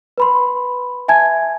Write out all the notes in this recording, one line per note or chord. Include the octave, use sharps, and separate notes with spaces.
B4 B5 C6
E5 G#5 A5 G#6